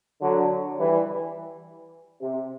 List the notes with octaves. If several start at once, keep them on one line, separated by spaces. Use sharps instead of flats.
D3 F#3
E3 G3
C3